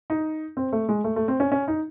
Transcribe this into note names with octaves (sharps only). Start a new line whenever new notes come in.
D#4
C4
A3
G#3
A3
A3
C4
C#4
C#4
D#4